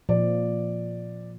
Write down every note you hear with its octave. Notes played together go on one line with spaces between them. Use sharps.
A#2 F3 D5